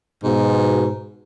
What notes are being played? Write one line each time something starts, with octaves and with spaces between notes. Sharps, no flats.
G#2 B2